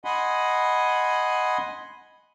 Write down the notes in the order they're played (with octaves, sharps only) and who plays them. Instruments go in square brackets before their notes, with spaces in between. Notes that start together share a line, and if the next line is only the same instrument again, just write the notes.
[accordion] D#5 F#5 G#5 B5 C6